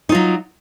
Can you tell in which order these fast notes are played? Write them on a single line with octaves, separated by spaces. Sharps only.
D#4 F4 F#3